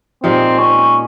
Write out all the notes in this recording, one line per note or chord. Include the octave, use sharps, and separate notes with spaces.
A#2 G#3 C4 D#4 G4
C#4